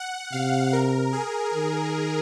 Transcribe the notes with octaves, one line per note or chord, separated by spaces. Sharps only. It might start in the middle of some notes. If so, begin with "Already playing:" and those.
Already playing: F#5
C3 F5
A#4
G#4
D#3